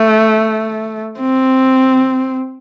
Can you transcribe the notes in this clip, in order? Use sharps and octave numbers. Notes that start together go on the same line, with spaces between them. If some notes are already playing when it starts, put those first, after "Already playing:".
Already playing: A3
C4